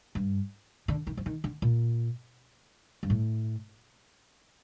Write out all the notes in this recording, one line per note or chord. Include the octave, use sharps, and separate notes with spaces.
G2
D3
D#3
F3
D#3
D3
A#2
G2
A2